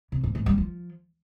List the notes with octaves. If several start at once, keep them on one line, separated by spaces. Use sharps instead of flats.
C3
G#2
G#2
G3
F3